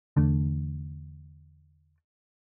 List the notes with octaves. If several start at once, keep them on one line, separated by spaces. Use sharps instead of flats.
E2 D3 A3 D4